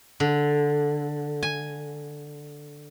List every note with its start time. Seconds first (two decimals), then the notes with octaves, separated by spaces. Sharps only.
0.20 D3
1.43 G#5